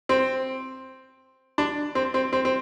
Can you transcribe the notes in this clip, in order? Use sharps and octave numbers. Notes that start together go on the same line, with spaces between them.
C4
D4
C4
C4
C4
C4